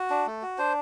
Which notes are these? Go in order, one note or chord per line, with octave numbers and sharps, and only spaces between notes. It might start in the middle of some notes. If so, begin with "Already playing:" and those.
Already playing: F#4
D4
A3
F#4
D4 C5